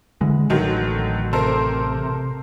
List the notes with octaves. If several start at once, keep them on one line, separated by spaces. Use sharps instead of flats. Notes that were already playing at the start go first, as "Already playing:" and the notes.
D3 E3 G#3
A1 D3 D#3 F#3
C3 A4 A#4 C5